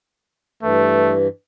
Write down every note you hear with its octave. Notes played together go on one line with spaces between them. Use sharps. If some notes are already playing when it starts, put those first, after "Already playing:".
G2 E3 A3